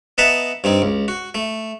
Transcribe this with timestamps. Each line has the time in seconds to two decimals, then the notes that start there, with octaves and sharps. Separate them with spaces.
0.18 B3 D#5 E5 F#5 A5 A#5
0.64 G2 C4 D#4
0.82 C#2
1.08 F#4
1.35 A3